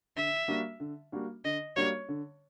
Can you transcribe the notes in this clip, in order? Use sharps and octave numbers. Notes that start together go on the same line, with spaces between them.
D3 E5
G3 A#3 D4 F#4
D3
G3 A#3 D4 F#4
D3 D#5
G3 A#3 D4 F#4 C#5
D3